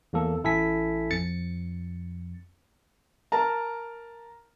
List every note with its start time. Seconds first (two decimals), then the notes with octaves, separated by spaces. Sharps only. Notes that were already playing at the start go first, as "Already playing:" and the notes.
0.13 E2 A#3 A4
0.44 A1 E4 A4 G#5 B6
1.11 F2 A6 C#7
3.32 A#4 A5 A#5